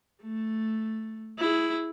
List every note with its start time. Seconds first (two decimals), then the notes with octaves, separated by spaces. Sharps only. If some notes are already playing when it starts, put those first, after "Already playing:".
0.22 A3
1.39 E4 G#4